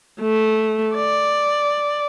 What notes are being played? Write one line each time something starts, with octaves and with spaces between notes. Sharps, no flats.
A3
D5